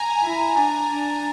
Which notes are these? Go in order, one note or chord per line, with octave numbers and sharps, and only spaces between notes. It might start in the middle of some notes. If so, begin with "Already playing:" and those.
Already playing: G#5 A#5
E4
D4
D4